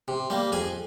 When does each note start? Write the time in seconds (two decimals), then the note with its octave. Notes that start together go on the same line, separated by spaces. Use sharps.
0.08 C3
0.30 G3 A#3
0.52 F2 G#4 G#5